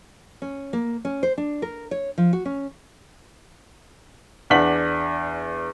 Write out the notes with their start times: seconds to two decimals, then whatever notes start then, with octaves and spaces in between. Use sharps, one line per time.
0.42 C#4
0.73 A#3
1.05 C#4
1.23 C5
1.38 D4
1.62 A#4
1.91 C#5
2.18 F3
2.33 F#4
2.45 C#4
4.50 E2 D4 F#5 B6 F#7